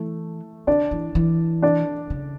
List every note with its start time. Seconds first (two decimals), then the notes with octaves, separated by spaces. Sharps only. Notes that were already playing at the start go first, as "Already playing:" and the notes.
Already playing: E3 A3
0.67 D3 D4 D5
0.91 E3
1.15 E3
1.62 D4 D5
2.10 C#3